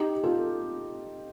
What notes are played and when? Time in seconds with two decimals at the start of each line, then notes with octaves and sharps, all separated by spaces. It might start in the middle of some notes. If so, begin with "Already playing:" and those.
Already playing: D#4 G4
0.23 F4 A4